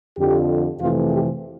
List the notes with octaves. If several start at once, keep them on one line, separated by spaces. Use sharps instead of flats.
F2 D3 F3 G4
F2 C3 E3 A3 F4
G4